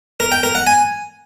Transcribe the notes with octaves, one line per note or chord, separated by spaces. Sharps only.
A#4
G5
A#4
F#5
G#5